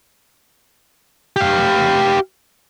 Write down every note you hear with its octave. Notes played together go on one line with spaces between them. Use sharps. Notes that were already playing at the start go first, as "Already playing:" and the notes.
G4 F5